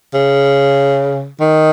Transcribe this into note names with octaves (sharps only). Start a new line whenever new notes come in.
C#3
D#3